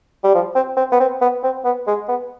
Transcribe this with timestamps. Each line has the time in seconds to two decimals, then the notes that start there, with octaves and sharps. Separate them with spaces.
0.23 G3
0.34 F3
0.55 C4
0.77 C4
0.92 B3
1.00 C4
1.21 B3
1.43 C4
1.65 B3
1.87 G#3
2.08 B3